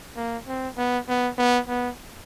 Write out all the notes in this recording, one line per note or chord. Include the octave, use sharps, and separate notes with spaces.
A#3
C4
B3
B3
B3
B3